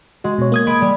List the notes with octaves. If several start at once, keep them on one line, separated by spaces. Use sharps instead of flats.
G#3 F#4
B2 C#5
A#3 D#6 G#6
G#3 B5 D7
G3